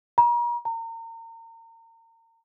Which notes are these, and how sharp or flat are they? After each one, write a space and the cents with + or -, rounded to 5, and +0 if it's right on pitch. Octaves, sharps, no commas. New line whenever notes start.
A#5 +40
A#5 -35